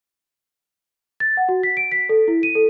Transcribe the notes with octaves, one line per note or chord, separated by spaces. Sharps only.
A6
F#5
F#4
B6
D7
B6
A4
E4
D#7
A4